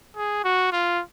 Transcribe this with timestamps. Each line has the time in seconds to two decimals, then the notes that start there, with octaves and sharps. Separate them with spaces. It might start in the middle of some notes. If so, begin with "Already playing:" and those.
0.16 G#4
0.44 F#4
0.72 F4